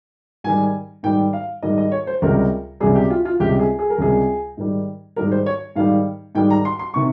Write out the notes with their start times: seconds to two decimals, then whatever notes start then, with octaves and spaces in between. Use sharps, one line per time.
0.44 G#2 D#3 G3 G#5
1.03 G#2 D#3 G3 G5
1.33 F5
1.63 G#2 D#3 G3 D#5
1.78 D#5
1.92 C#5
2.07 C5
2.22 C#2 C3 G3 A#4
2.80 C#2 C3 G3 G#4
2.95 G4
3.10 F4
3.25 F4
3.40 C#2 C3 G3 G4
3.59 G#4
3.79 G#4
3.90 A#4
3.98 C#2 C3 G3 G#4
4.57 G#2 D#3 G3
5.16 G#2 D#3 G3 A#4
5.32 C5
5.46 C#5
5.76 G#2 D#3 G3 F5
6.35 G#2 D#3 G3 G5
6.50 A#5
6.65 C6
6.79 C6
6.94 C3 D#3 C#6